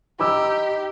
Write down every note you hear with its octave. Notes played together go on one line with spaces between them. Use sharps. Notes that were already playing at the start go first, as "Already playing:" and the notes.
D#4 G4 B5 D6 E6